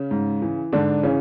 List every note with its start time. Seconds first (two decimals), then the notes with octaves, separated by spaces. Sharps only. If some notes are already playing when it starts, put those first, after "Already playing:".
Already playing: C#3 C#4
0.11 G#2
0.42 E3
0.73 G#2 D3 D4
1.03 C#3 E3 C#4